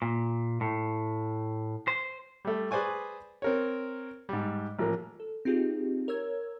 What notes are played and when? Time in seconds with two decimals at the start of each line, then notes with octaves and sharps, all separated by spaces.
0.02 A#2
0.61 A2
1.88 C5
2.45 G3 A3
2.71 G#4 B4 C5 D5 G#5 C#6
3.42 C4 A#4 C#5
4.29 G#2 G3
4.78 A1 F3 A#3
5.20 A4
5.45 C4 D#4 F4 G4 G#4
6.08 A#4 C#5 E6 G#6